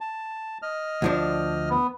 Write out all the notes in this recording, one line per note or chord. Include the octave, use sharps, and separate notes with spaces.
A5
D#5 F6
D2 F3 D4
B3